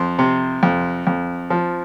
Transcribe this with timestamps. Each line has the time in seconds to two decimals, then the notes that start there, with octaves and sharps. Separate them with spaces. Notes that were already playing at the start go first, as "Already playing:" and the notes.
Already playing: F2 C5
0.19 C3
0.63 F2
1.07 F2
1.50 F3